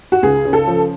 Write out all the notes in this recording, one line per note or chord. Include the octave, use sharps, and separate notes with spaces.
F#4
C#2 G#4
C#3
A4
F3